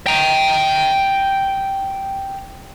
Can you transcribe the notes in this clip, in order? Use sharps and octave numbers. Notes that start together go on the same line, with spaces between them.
G5 A#5